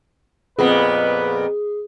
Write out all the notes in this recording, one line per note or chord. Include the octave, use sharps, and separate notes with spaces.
F2 A#2 B3 G#4 B4